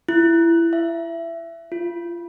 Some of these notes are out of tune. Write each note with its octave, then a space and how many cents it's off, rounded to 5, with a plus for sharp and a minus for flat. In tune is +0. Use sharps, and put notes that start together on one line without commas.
E4 +20
E5 +20
F4 -30